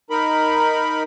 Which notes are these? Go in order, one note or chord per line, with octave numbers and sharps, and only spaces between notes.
D#4 A#4 B5